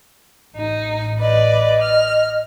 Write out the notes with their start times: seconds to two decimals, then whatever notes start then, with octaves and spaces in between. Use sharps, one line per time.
0.57 A1 D#4
1.21 B4 D5 D#5
1.82 F6